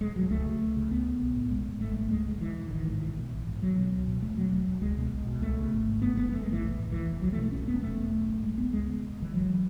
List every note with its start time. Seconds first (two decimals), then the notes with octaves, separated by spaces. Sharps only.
0.01 E1 G#3
0.16 E1 F#3
0.31 C#2 A3
0.46 C#3
0.61 C#2
0.76 C#3
0.91 C#2 B3
1.06 C#3
1.22 B1
1.36 A2
1.51 E1 G#3
1.66 E1
1.81 G#1 A3
1.96 G#2 A3
2.11 C#2 G#3
2.27 C#3
2.41 E1 E3
2.56 E1
2.71 A1 D#3
2.87 G#2
3.01 B1 E3
3.16 B2
3.31 A1
3.47 G#2
3.62 B1 F#3
3.76 B2
3.91 C#2
4.07 B2
4.21 E1 A3
4.37 E1 F#3
4.51 E1
4.67 E1
4.81 C#2 G#3
4.97 B2
5.12 B1
5.27 B2
5.41 C#2 A3
5.58 C#3
5.72 G#1
5.87 G#2
6.02 F#1 B3
6.17 F#1 B3
6.32 F#1 A3
6.42 G#3
6.47 F#1 E3
6.62 B1
6.77 A2
6.92 E1 E3
7.07 E1
7.22 B1 F#3
7.32 A3
7.38 B2
7.43 A3
7.52 E1 C#4
7.68 E1 B3
7.82 E1 A3
7.98 E1
8.13 B1
8.28 A2
8.43 F#1 G#3
8.57 F#1 B3
8.73 C#2 G#3
8.88 C#3
9.03 E1
9.17 E1
9.22 E3
9.33 G#1 F#3